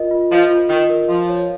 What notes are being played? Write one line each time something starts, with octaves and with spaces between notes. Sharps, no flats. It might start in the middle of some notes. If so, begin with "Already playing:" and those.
Already playing: F4 A#4 D#5
F4
F3 D#5
F4
D#3 D#5
A#4
F3 F5
C#5